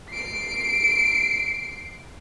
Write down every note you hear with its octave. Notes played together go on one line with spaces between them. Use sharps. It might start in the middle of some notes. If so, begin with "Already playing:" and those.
C7 D7